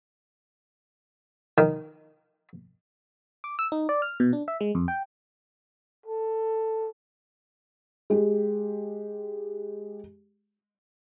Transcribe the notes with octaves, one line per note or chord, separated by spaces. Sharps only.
D#3
D6
E6
D#4
D5
F6
B2
D4
E5
G#3
F2
G5
A4
G#3 G4